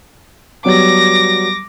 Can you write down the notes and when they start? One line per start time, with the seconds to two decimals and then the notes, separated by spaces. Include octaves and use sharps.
0.65 F#3 G3 B3 D6 A#6